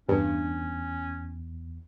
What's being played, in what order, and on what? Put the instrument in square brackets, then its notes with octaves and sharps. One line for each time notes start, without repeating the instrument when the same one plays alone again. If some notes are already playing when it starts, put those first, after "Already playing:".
[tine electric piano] E2 [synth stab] G2 [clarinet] C#4